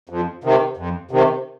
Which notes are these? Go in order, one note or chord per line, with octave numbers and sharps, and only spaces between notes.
F2
C3 D#3
F2
C3 D#3